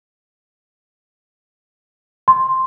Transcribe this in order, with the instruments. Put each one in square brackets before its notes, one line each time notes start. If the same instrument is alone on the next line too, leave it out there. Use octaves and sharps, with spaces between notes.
[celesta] C6